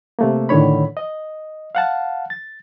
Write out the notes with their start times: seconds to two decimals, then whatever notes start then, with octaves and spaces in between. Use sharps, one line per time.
0.19 C3 A3 A#3
0.49 A2 D3 D#3 C#5 B5
0.97 D#5
1.75 F5 F#5 A5
2.30 A6